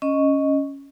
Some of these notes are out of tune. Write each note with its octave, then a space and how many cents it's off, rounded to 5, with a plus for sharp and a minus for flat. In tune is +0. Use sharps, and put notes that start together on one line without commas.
C#4 +0 D#5 +0 C#6 +0